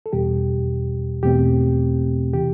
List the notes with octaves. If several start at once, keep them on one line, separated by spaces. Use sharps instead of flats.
A4
E2 B2 G3 G4
E2 B2 A3 C4 G4
C3 E3 G4